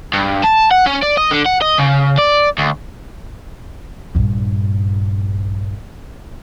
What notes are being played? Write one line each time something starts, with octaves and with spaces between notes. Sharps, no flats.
G2
A5
F#5
C#4
D5
D#5
D3
F#5
D#5
C#3
D5
D2
A#1 G2